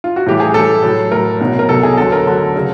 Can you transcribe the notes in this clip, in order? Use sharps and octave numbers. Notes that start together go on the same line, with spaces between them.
F4
F#4
A2 E3 G3 G4
G#4
A2 E3 G3 A4
A2 F#3
A2 F#3 A#4
C2 B2 F#3
A#4
C2 B2 F#3 A4
G#4
D2 D3 F#3 A4
A#4
D2 D3 F#3
C#3 F#3